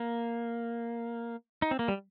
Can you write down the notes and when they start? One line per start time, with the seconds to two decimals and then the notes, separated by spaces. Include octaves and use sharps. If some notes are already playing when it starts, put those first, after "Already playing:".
Already playing: A#3
1.62 D#4
1.71 C4
1.79 A#3
1.88 G3